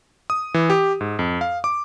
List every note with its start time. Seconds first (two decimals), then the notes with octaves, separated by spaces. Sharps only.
0.30 D#6
0.54 E3
0.70 G4
1.01 G#2
1.19 F2
1.41 F5
1.64 D6